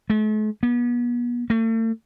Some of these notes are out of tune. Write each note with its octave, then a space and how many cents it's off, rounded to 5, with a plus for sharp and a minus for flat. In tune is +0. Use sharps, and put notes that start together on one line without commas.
A3 -45
B3 -35
A3 +40